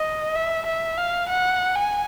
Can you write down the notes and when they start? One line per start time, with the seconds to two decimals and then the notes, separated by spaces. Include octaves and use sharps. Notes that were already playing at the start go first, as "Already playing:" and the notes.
Already playing: D#5
0.35 E5
0.66 E5
0.97 F5
1.29 F#5
1.76 G#5